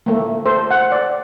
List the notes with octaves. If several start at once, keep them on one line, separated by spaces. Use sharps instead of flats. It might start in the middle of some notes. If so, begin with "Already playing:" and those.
A3 A#3
A4 C5
F#5
D5